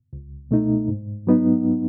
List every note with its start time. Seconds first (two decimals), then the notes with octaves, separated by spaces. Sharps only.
0.13 C#2
0.51 B2 A3 D#4
0.88 G#2
1.27 F#3 B3 D#4